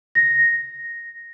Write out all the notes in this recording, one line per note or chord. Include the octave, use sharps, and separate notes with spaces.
A#6